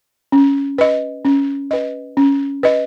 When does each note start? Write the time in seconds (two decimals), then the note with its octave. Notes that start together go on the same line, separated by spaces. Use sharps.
0.32 C#4
0.78 B4 D#5
1.25 C#4
1.71 B4 D#5
2.17 C#4
2.63 B4 D#5